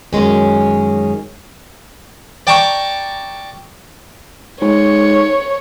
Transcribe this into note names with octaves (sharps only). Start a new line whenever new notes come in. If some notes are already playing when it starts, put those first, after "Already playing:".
F#2 D#3 G#3 C#4
D5 G5 A5 A#5 C#6 D6
G#2 C#5